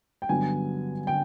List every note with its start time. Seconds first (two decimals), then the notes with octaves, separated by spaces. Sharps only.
0.22 G5
0.29 G2 D3 F#3 B3 G#5
1.07 D3 G5